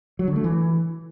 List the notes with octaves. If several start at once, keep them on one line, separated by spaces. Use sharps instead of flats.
F#3
D3
A3
E3